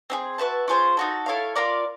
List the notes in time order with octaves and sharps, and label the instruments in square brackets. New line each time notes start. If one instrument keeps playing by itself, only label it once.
[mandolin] C4 E4 G#4
F#4 B4 E5 A5
C#4 F4 G#4 C5
D#4 F#4 A4
E4 A4 C#5 F5
F4 A#4 D5 F5